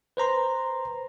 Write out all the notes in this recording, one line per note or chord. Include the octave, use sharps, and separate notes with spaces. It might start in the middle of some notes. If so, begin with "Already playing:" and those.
B4 C5 A#5 C6